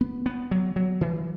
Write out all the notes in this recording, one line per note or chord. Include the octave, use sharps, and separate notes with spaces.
B3
B3
F#3
F#3
E3